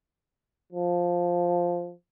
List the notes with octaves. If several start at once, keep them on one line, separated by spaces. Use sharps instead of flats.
F3